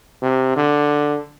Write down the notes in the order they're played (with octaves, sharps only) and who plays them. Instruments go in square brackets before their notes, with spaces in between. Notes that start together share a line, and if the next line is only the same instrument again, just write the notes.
[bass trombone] C3
D3